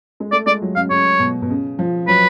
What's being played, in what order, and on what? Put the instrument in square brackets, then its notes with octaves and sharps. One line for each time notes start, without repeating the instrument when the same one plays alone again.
[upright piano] G#3
[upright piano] A3 [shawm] D5
[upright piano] G#3 [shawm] D5
[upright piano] F#3
[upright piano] C#3 [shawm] F5
[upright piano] C#3 [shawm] C#5
[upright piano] B2
B2
C#3
F3
[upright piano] F#3 [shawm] B4